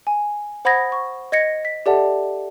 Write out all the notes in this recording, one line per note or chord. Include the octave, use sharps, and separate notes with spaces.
G#5
C5 F#5 B5 D#6 G#6 A#6
C#6
D#5 G#6 A#6 C#7
B6
G4 A4 D5 E5 F#5 A5